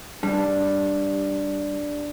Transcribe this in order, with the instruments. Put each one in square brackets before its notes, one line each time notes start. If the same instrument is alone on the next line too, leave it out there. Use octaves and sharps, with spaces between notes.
[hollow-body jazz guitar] G3 [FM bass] D4